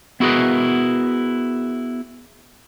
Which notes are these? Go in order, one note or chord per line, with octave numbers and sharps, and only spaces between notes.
B3 E4 F#4 G#4 A#4 B4